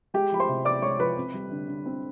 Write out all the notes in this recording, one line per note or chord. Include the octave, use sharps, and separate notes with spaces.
G#3 G4 G5
F3 B5
C5 C6
C3
B3 D5 D6
G#3 C#5 C#6
F3 B4 B5
C4
G3
D3
D3
C4